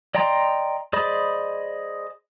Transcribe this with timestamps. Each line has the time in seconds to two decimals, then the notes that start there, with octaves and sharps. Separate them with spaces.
0.15 D5 D#5 G5 A#5 C6
0.93 G#4 C5 D5 D#5 B5